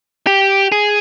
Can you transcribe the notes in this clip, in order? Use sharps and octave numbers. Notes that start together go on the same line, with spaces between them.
G4
G#4